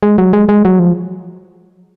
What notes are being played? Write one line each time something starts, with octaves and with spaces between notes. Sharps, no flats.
G#3
F#3
G#3
G#3
F#3
F3